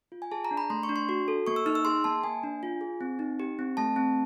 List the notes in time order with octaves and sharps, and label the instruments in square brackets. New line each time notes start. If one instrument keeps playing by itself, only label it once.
[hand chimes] F4
G#5
G#4 A5
A#5
D4
B5
A3 C6
C#6
D4
C6
F#4
A4
A#3 C#6
E6
D#4 F6
E6
G#4 C6
A#3 A5
A#3 G#5
D4
F4
G#4
C4
D#4
G4
C4
A3 A5
C4